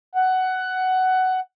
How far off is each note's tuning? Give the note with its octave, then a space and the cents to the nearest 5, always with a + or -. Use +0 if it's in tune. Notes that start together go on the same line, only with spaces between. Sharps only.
F#5 +15